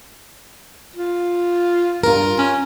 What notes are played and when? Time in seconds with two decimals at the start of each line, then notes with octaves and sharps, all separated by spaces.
0.96 F4
2.03 G2 F4 A#4
2.38 C#4